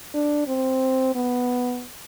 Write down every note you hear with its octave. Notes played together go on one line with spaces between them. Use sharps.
D4
C4
B3